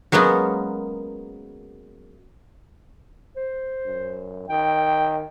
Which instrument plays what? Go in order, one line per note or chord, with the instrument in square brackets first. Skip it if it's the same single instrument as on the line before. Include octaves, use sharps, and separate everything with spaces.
[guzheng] F#3 G#3 A#3 B3 C#4
[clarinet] C5
[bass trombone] F#2
[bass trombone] D#3 [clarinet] G5